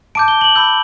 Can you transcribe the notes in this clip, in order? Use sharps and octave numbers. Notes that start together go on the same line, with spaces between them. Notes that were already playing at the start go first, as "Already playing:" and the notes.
A5 D6 G6 D7
G7
F#7
B5 E6 G6